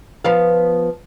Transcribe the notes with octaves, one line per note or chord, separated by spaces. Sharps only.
F3 B3 F5